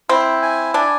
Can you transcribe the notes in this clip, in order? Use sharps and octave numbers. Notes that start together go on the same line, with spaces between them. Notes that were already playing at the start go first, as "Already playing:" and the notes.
C4 E4
G#5
D4 G#5